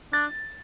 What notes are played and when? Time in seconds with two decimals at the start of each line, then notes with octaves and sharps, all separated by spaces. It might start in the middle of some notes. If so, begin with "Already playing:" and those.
0.13 D4 A6